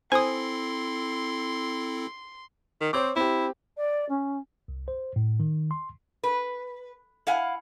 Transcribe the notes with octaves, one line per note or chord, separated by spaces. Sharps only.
C4 E4 A4 C5 G#5 C6 D#6
D#3
C4 C5 C#5 D6
C4 E4 G4
D5
C#4
C2
C5
A2
D#3
C6
B4
E4 F5 F#5 G#5